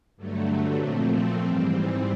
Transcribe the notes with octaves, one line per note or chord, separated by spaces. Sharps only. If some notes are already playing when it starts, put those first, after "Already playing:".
G2 D3 F#3 A3
A#2 F3 A3 C4
G#2 E3 G3 C4